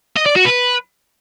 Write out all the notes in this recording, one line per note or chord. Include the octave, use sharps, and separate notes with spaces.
D#5
D5
F#4
B4